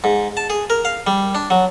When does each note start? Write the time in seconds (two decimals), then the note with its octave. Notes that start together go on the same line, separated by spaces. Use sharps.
0.04 G#2
0.37 A5
0.50 G#4
0.70 A#4
0.85 F5
1.07 G3
1.35 D4
1.50 F#3